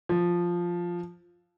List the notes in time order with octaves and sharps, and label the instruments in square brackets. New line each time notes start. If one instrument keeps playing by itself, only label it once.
[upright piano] F3